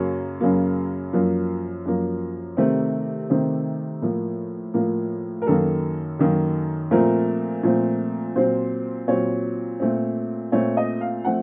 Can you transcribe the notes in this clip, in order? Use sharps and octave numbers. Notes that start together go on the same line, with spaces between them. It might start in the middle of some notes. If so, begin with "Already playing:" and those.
Already playing: F#2 C#3 F#3 A#3 C#5
F#2 C#3 F#3 A#3
F#2 F3 A#3
F#2 F3 A#3
C3 D#3 A3 C4 A#4
C3 D#3 A3 C4
A2 F3 A#3
A2 F3 A#3
A#4
F#2 D#3 A#3 A4
F#2 D#3 A#3
A#2 F3 A3 C4 A#4
A#2 F3 A3 C4
A#2 F#3 C4 C5
A#2 F#3 C4 C#5
A#2 A3 C4
A#2 A3 C4 C#5
D#5
F5
F3 A3 C4 F#5